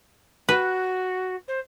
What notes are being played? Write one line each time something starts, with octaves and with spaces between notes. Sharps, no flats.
F#4 B4
C5